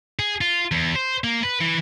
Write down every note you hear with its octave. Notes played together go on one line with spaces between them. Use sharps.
G#4
F4
E2
C5
A#3
B4
E3